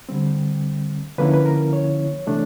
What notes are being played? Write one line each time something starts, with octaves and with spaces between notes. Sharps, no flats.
D3 G3 C4
D3 F3 A#3 C#4 E4 B4
B4
A#4
C#5
C3 E3 A3 D4